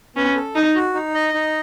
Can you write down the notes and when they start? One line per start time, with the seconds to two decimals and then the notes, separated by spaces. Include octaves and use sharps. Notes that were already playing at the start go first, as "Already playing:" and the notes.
0.16 B3 C#4
0.36 A4
0.56 D#4 D#5
0.75 F#4
0.94 D#4
1.14 D#5
1.34 D#4